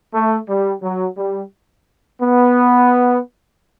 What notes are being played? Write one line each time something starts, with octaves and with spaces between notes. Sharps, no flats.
A3
G3
F#3
G3
B3